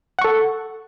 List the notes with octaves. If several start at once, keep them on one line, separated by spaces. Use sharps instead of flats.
A4 F#5 C#6